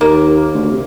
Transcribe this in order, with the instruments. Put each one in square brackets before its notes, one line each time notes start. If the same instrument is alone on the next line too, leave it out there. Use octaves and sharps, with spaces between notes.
[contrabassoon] D#2 [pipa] A#3
[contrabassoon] D2
C3